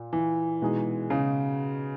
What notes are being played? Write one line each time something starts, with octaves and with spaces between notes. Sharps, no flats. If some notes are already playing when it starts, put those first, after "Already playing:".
Already playing: A#2
E3
B2 G#3 D#4 G#4
C#3